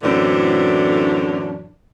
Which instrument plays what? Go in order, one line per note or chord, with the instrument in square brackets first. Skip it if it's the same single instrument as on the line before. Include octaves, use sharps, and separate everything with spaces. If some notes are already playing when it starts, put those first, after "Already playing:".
[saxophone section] F#2 A2 D3 E3 C4 D4